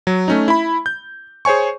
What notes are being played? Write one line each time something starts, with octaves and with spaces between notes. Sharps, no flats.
F#3
A3 C#4 D#4
E4 B5
G6
G#4 C5 C#5 G#5 C#6